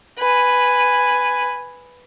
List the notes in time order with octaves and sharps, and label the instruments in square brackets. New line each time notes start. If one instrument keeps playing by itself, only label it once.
[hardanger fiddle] B4 G#5